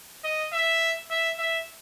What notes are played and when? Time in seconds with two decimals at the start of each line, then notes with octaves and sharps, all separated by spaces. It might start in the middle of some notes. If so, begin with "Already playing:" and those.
0.24 D#5
0.53 E5
1.11 E5
1.39 E5